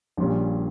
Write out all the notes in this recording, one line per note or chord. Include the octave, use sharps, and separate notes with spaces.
A#1 A#2 G3 C#4